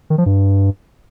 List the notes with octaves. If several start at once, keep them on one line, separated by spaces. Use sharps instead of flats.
D#3
F3
G2